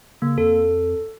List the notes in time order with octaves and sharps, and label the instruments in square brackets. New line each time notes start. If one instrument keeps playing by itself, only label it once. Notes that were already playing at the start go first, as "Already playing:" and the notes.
[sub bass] C#3 [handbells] A#3
[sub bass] F2 [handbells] A4